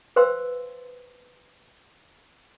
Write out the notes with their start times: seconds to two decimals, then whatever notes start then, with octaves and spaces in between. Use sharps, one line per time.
0.16 B4 C5 F5 G5 C6 E6